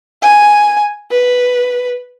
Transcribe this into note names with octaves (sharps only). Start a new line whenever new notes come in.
G#5
B4